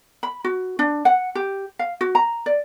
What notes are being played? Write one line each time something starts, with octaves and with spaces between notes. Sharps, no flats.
B5
F#4
D4
F#5
G4
F5
F#4
A#5
D5